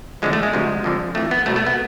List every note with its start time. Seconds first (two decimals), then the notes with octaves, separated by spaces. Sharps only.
0.22 E2 D3 F3 G#3
0.33 A3
0.43 G#3
0.53 D2 C3 F3
0.84 F2 D3 F3
1.15 F2 E3 A3
1.31 B3
1.46 C2 B2 A3
1.56 A3
1.66 B3